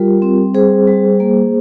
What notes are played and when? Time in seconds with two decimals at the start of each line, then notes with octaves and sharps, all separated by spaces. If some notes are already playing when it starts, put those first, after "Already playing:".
Already playing: G3 F4 G4 A#4
0.22 C4
0.54 G3 G#4 C5
0.87 G3
1.20 A#3